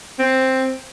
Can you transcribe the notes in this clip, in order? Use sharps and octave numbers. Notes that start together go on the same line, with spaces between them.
C4